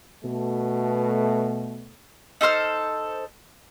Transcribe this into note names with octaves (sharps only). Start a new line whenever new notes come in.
B2 A3
D#4 A4 C5 F6